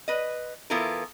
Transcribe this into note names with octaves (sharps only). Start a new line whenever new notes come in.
B4 D#5
E3 B3 E4 F4 A4 A#4